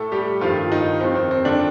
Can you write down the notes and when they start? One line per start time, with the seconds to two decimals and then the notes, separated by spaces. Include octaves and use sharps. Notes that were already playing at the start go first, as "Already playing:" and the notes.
Already playing: A2 A3 A4
0.12 G3 G4
0.41 G2 D#3 F3 F4
0.72 D#3 D#4
1.01 F2 D#3 C4
1.15 C4
1.31 C4
1.45 D3 D4